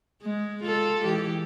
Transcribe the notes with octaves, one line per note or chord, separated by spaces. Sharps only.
G#3
F4 A4
E3 G#3 G4